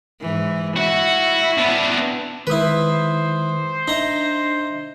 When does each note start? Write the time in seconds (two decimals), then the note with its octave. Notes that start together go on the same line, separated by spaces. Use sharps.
0.21 G#2 E3
0.77 E4 F#4
1.57 B3 D4
2.47 D#3 G#3 E4 B4 C5 D#6
3.88 D4 D#4 E5 A#5